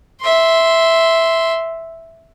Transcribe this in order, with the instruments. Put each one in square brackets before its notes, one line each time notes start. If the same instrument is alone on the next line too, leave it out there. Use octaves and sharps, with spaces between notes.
[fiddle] E5 C6